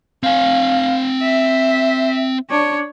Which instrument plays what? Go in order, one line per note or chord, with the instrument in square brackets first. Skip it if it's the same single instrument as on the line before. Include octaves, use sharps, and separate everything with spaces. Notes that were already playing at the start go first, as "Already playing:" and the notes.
[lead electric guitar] C4 G#5 [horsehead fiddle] F5
[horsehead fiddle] E5
D4 C#5